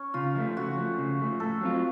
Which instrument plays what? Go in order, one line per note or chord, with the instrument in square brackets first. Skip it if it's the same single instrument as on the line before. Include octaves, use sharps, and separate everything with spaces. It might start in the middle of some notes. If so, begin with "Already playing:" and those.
Already playing: [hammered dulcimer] C#4
[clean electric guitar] C#3 [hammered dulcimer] F4
[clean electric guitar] F3 A3
[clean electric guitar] C#3 [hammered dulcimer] F#4
[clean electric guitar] F3 A3
C#3
F3 A3
[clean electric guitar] A2 [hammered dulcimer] A4
[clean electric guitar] F#3 C4 F4